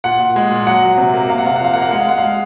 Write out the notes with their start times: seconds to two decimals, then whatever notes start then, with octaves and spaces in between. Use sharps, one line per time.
0.04 A#2 F#5
0.20 A#2
0.36 G#3
0.51 A#2
0.67 F#3 F#5
0.83 F#3
0.98 C3
1.14 A#3
1.30 C3 F5
1.38 F#5
1.45 C3 F5
1.56 F#5
1.61 F3 F5
1.73 A#3 F#5
1.82 F5
1.91 G#3 F#5
2.00 F5
2.07 G#3 F#5
2.18 F5
2.23 G#3